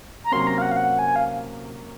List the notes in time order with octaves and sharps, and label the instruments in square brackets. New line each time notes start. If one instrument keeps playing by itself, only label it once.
[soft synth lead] A#5
[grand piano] C3 F#3 A#3 C#4 [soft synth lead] C6
[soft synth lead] A#5
F5
F#5
F5
F#5
G#5
F5